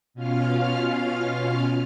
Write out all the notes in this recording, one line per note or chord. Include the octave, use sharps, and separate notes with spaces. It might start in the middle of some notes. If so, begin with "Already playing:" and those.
B2 C#4 F4 F5 F6